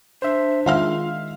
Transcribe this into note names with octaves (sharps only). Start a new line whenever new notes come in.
D4 C5 E5
D#3 G#3 F4 E5 F5 F6